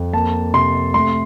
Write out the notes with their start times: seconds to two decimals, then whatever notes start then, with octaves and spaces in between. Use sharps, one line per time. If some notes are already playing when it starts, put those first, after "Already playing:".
Already playing: F2
0.13 A#3 A5
0.54 C3 C6
0.94 A3 C6